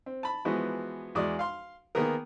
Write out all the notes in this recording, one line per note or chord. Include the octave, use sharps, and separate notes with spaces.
C4
A5 B5
E3 F3 G#3 B3 F#4
E2 G#3 F#4 D5 D#6
F5 C6
D#3 A#3 B3 G#4 A#4